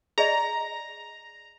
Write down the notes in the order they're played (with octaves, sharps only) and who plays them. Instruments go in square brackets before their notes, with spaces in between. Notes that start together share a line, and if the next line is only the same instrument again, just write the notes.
[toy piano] G#4 D5 D#5 [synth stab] A#5